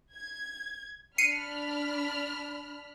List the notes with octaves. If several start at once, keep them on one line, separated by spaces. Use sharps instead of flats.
G#6
D4 B5 F6 C7 C#7 D#7